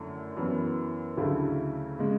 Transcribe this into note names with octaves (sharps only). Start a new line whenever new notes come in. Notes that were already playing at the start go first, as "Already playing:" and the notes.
Already playing: F#2 D3 A3 E4
F#2 E3 B3
D2 C#3 F#3 A3 E4
C#3 G#3